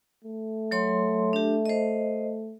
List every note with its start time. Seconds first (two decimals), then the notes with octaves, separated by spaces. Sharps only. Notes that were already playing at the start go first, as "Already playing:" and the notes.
0.25 A3
0.71 F#3 C#5 C6
1.33 D4 G4
1.66 C5 D#5